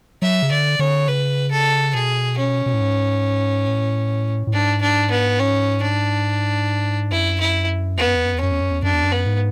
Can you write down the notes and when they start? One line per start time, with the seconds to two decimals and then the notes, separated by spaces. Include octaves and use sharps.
0.22 F#3 E5
0.42 C#3
0.51 D3 D5
0.79 D3 C#5
1.08 C#3 B4
1.51 A4
1.94 B2 G#4
2.38 C#4
2.66 B2
2.74 A2
2.80 G#2
3.67 A2
4.47 A2
4.53 G#2 D4
4.81 D4
5.11 B3
5.39 C#4
5.82 D4
7.11 F#2 E4
7.40 E4
7.97 E2 B3
8.07 F#2
8.15 E2
8.25 F#2
8.34 E2
8.40 F#2 C#4
8.52 E2
8.61 F#2
8.70 E2
8.83 F#2 D4
8.94 E2
9.03 F#2
9.12 B3
9.26 G#2